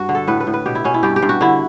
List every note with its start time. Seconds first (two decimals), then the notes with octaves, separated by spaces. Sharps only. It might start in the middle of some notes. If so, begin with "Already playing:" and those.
Already playing: G2 F#4
0.09 D3
0.15 A4
0.27 A2 B4
0.40 B4
0.47 A2
0.54 B4
0.66 B2 G4
0.75 E4
0.84 B2 C#4
0.94 E4
1.03 G2 G4
1.16 G4
1.22 G2
1.29 F#4
1.41 D3 E4